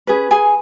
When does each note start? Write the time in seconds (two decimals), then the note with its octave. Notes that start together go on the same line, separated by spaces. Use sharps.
0.07 C#4 G#4 B4
0.31 G#4 G#5